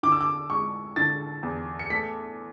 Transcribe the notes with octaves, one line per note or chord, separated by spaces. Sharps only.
D3 D6
E6
D6
G#3 C#6
D3 A6
E2
C#7
A3 B6